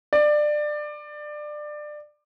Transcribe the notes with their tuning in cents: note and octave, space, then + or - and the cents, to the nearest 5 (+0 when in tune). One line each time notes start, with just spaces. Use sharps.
D5 +20